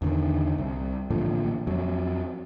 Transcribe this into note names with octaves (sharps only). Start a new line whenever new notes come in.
E2 D3 D#3
C2
A1 A#2 D3 F3
F2 F#3